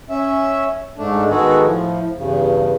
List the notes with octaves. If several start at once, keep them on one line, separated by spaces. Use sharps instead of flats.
C#4 E5
G#2 A3 D4
D#3 G#3 B3 F#4 G#4 A4
A2 F3
E2 G2 C#3